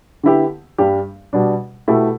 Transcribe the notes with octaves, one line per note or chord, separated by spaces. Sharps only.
D3 B3 E4 G4
G2 G3 D4 G4
B2 G3 D4
B2 A3 E4 G4